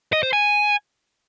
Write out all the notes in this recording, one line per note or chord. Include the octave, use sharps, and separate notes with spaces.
D#5
C5
G#5